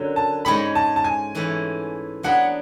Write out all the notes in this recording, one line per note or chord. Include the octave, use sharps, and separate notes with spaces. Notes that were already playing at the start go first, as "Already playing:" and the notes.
Already playing: F#2 D3 F#3
A5
G#2 G#3 C#4 G#4 B5
A5
A5
G#5
G#2 E3 A3 C#4 E4
F#3 B3 D4 G#4 B4 F#5